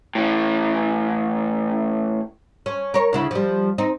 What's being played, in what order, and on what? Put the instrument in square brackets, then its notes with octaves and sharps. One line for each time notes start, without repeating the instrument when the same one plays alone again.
[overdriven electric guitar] A2 E3
[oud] C#4
A#4 C#5
D2 C#3 E4
F3 G3
C4 D#4